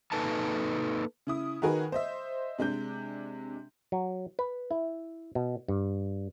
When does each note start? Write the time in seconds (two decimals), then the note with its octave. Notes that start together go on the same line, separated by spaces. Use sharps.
0.12 A#3 D#4 A4 B4 G#5 A5
1.27 C#3 E4 D#6
1.62 D#3 D#4 F#4 G#4 A#4 B4
1.92 C5 D#5 E5
2.59 C3 G#3 D4 G6
3.92 F#3
4.39 B4
4.71 E4
5.35 B2
5.68 G2